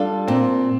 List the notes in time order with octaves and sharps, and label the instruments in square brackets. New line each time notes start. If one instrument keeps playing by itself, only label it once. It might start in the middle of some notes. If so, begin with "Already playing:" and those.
Already playing: [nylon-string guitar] G3 D4 F4 A4
[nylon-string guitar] A#2 [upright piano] C4